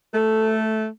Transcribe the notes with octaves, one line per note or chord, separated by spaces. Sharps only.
A3 A4